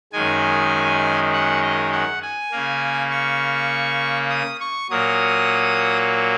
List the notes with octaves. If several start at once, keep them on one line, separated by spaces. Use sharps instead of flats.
F#2 D#3 G#3 G#5
F#5
D#5
F#5
G#5
C#3 A#3
C#6
D#6
C#6
A#2 F#3 A#3 D#6